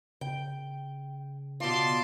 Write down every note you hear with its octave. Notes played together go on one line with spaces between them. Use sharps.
C#3 G5
B2 F4 D5 A5 C6